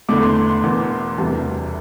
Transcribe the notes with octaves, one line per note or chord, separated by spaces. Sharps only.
E2 D3 A3 D6
C6
C6
C6
E1 E2 E3 D6
C6
E1 D2 C3 E3 G3 A5